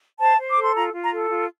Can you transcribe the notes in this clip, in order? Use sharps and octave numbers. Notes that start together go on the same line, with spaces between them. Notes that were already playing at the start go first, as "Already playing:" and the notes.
C5 A5
C5
D6
A4
C6
F4 A#5
F4
A#5
A4
F4